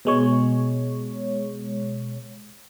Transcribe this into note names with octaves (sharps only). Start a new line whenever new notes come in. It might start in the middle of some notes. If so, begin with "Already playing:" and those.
B2 G#3 C#5